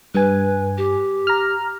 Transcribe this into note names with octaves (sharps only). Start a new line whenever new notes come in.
G2 B4 G#5
G4
A#5 F6